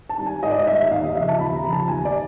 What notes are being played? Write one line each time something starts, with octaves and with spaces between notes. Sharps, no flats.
A5
D#3 G3
G#5
G#2 D#5
D5
D#5
D#3 G3 E5
D#2 F5
D#5
C#3 F3 E5
A5
D#2 B5
A#5
C#3 F3
A5
D#2 G#5
D5